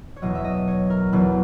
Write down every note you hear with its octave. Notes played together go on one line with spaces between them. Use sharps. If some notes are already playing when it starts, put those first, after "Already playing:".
C#5
E2 B2 F#3 D#5
E5
D#5
C#5
A#4
E2 B2 F#3 B4